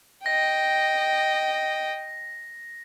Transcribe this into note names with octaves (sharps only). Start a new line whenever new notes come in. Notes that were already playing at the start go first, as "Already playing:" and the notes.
D#5 G5 A#6